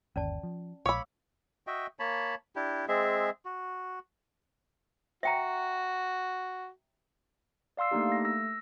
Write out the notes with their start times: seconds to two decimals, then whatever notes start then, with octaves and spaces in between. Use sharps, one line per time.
0.16 G1 D#2 C#4 D5 A5
0.43 F3
0.86 A#1 C#5 F5 B5 D6 E6
1.67 F#4 D#5 E5 G5
1.99 A#3 C#5 A5 B5
2.56 D4 E4 G4
2.88 G#3 C4 G#4 E5
3.45 F#4
5.23 F#4 E5 G5 A#5
7.77 D5 F5 C6 E6 C7
7.91 A3 A#3 D4 D#4 G4
8.09 A3 A#6
8.25 E6 A#6